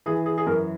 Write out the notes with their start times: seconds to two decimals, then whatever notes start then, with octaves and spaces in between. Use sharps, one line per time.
0.06 E3 G#4
0.26 G#4
0.38 G#4
0.47 F#2 A#4